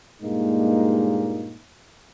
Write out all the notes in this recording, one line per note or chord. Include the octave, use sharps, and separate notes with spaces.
G2 A#2 G#3 A#3 D#4